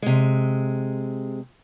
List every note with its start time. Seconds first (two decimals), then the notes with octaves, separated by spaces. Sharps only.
0.02 C3 G#3